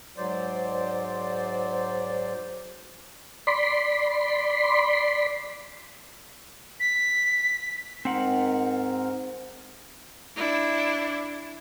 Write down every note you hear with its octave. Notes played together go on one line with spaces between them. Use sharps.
G#2 F#3 C5 D5
D5 B5 C6
B6
G#2 C4 A#4 F#5
D4 E4